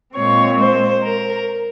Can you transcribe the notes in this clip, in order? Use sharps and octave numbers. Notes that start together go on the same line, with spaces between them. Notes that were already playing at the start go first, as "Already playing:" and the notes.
A#2 G#3 C4 C#5
C5
A#4